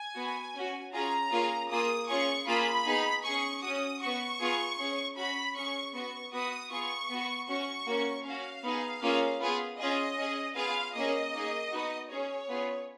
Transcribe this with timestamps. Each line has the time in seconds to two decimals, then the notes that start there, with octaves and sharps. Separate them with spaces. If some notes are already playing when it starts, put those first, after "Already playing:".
Already playing: G#5
0.16 B3 F#4
0.55 C#4 F#4
0.93 C#4 F4 G#4 A#5
1.31 A#3 C#4 F4 G#4
1.70 A#3 F4 G#4 D#6
2.09 C#4 F4 G#4 C#6
2.47 A#3 F4 G#4 B5
2.86 B3 D#4 G#4
3.24 C#4 G#4 C#6
3.63 C#4 F#4 D#6
4.01 B3 F#4 C#6
4.40 B3 F4 G#4
4.78 C#4 G#4
5.16 C#4 F#4 B5
5.55 C#4 G#4 C#6
5.94 B3 F#4 C#6
6.33 B3 F#4 D#6
6.71 B3 F4 G#4 C#6
7.10 B3 F#4
7.48 C#4 F#4 C#6
7.86 A#3 C#4 F#4
8.25 C#4 F#4 F5
8.64 B3 D#4 G#4
9.02 A#3 C#4 F4 G#4
9.41 B3 F4 G#4
9.79 C#4 F4 G#4 D#5
10.18 C#4 G#4
10.56 B3 F4 G#4 F5
10.95 A#3 C#4 G#4 D#5
11.33 A#3 D#4 G#4
11.71 B3 D#4 F#4
12.10 C#4 G#4 C#5
12.49 B3 F4 G#4